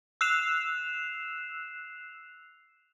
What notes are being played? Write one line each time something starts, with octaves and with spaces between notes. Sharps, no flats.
E6 F#6 C7 E7 F7